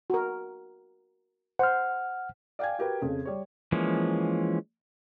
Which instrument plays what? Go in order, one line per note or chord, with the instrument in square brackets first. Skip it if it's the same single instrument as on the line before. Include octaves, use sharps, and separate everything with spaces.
[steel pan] F#4 A#4
[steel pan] C5 [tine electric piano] F#5 F6
[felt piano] D5 F5 G5 G#5 G#6
F#4 G4 A#4 B4
F2 C#3
G3 C#5
[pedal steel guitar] E3 F3 G#3 A#3 C#4